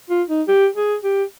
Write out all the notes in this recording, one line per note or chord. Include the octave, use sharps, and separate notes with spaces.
F4
D#4
G4
G#4
G4